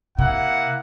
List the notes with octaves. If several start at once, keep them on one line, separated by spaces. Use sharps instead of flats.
C3 A#3 E4 F#5